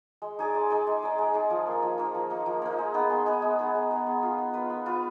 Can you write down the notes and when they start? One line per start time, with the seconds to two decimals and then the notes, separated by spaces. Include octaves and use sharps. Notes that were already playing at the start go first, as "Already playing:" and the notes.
0.22 G#3
0.39 D#4 G#4 D5
0.54 G#3
0.70 D#4 G#4 D5
0.87 G#3
1.02 D#4 G#4 D5
1.18 G#3
1.34 D#4 G#4 D5
1.50 F3
1.67 A#3 D#4
1.83 F3
1.98 A#3 D#4
2.15 F3
2.30 A#3 D#4
2.46 F3
2.62 A#3 D#4
2.78 G#3
2.94 B3 D#4 G#4
3.10 G#3
3.26 B3 D#4 G#4
3.42 G#3
3.59 B3 D#4 G#4
3.75 G#3
3.91 B3 D#4 G#4
4.06 B3
4.23 F4 B4
4.38 B3
4.54 F4 B4
4.70 B3
4.86 F4 B4